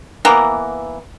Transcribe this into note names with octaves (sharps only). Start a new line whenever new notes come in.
E3 A#3 B3 A#5